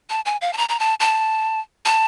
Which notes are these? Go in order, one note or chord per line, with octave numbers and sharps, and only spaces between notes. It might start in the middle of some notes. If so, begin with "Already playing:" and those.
A5
G#5
F5
A5
A#5
A#5
A5
A5
A5